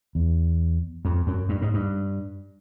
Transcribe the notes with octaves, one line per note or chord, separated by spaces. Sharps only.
E2
F2
F#2
G2
G#2
G2